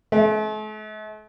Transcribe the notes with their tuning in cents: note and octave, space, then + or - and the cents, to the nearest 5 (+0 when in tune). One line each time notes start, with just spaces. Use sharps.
A3 -45